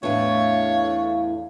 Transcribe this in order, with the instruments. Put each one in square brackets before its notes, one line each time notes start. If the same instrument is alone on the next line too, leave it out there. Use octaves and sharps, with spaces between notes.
[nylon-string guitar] E2 A2 [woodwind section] A3 D4 [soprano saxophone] C#5 [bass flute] F5